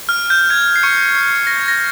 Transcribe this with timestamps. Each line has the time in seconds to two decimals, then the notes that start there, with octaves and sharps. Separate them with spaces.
0.09 F6
0.30 G6
0.50 G#6
0.76 C7
0.83 C#6 C#7
1.15 C7
1.47 A#6
1.58 G#6
1.68 A#6